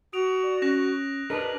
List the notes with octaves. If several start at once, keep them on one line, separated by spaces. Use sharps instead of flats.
F#4 D#6 D7 F7
D5
C#4 F#6 A#6 E7
D4 G#4 A#4 B4 D#5